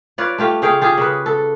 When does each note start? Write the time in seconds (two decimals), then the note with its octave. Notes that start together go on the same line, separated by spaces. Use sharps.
0.18 F4 B4 C#5 D5
0.38 A3 F4 G4
0.62 C#3 G#4 F5 G5
0.81 F4 G4 G#4
0.97 C#3 B4
1.26 A4